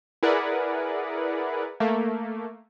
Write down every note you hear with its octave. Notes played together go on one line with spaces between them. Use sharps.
E4 G#4 A#4 B4 D5 F#5
A3 A#3